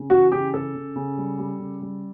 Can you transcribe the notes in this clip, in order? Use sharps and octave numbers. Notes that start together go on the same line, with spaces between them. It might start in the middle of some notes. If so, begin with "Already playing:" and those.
Already playing: C#3
E3 F#4
C#3 G4
C#3 A4
C#3
C#3
G3
G3
C#3
G3